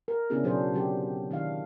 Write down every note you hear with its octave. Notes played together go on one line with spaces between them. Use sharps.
A#4
C#3 B3 C#4 D4 E4 G#4
B2 F#3 D4 G#4 C5
D3 F#3 C4 G4
D#3 D4 E4 F5